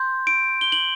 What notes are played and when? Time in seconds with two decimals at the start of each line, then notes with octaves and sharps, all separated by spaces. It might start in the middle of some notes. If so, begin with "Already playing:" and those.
Already playing: C6 G6
0.27 D7
0.61 G7
0.72 F#7